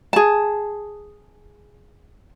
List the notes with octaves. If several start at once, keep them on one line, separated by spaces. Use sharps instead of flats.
G#4 A5